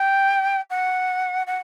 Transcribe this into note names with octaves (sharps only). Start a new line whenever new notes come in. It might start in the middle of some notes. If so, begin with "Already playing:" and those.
Already playing: G5
F#5
F#5